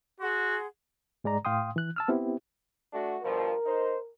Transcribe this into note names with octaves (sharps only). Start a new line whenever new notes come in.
F#4 G#4 F#5 C6
G#2 G#3 D5 A#5
A2 F5 G5 C6 D#6
E3 F#6
A5 E6 F6
B3 C4 E4 G4
A3 D4 F#4
G2 B2 F3 A#4
D#4 C5